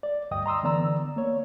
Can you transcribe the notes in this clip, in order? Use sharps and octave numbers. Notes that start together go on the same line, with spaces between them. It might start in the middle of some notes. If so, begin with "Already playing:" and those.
D5
D2 G2 D#5 G5 D#6
A#5 C6 D#6 E6
D3 E3 B3 D5 A#5 E6
A#3 C#5